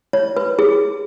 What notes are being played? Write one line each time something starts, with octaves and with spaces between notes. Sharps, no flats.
C#5
B4
G#4